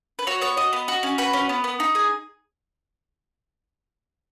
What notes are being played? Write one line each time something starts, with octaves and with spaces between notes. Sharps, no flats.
B4
F#4 C#5
B3 C#5
F#4 D#5
B3
F#4
C#4
F#4 B4
C#4
B3
B3
D#4
G#4